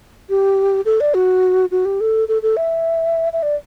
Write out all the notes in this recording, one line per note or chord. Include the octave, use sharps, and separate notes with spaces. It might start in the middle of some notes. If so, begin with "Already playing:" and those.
G4
A4
D5
F#4
F#4
G4
A4
A4
A4
E5
E5
D5